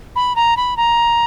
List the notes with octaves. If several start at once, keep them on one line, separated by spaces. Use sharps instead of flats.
B5
A#5
B5
A#5